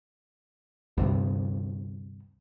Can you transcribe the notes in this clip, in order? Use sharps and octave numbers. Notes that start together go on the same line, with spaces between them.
D2 G2 C3